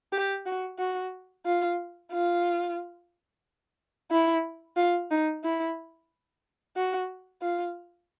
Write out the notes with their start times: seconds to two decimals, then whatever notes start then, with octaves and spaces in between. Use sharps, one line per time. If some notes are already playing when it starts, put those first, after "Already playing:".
0.12 G4
0.46 F#4
0.79 F#4
1.45 F4
2.12 F4
4.11 E4
4.76 F4
5.11 D#4
5.43 E4
6.76 F#4
7.42 F4